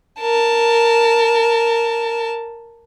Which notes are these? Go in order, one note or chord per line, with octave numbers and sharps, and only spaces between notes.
A#4 A5